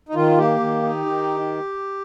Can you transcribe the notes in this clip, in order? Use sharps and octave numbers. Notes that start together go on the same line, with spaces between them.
D#4
D#3 F4
A#3 G4
D#3
D#4
D#3